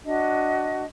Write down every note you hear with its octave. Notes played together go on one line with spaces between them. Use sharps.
D4 F#4 D#5